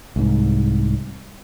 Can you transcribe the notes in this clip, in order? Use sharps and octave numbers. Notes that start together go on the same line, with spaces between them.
C2 G#2